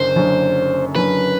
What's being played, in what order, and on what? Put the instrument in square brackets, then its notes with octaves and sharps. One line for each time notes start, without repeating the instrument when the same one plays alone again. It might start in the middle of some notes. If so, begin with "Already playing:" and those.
Already playing: [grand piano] F#1 F#2 D3 [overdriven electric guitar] C5
[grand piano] F#1 F#2 D3
[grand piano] F#1 F#2 D3 [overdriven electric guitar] B4